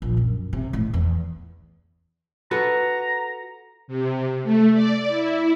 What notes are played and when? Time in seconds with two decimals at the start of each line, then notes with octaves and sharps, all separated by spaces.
0.02 A#1
0.17 F#2
0.53 C3
0.73 A2
0.94 E2
2.51 F#4 A4 B4 A#5
3.88 C3
4.44 A3
4.74 D5
5.08 E4